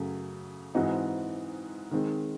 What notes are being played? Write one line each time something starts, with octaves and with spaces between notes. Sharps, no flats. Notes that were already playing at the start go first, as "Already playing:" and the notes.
Already playing: F#2 C#3 F#3 A3
G#2 E3 C4 D#4 F#4
D#3 G#3 C4